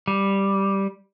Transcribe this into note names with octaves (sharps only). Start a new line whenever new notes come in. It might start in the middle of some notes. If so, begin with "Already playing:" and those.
G3